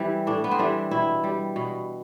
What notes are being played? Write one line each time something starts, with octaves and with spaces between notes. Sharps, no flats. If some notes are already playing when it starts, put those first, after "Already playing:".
Already playing: E3 G3 C4
A2 D4
B3
C4
E3 G3 D4
B2 E4
G3
B2